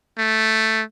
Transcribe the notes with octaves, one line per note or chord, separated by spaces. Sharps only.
A3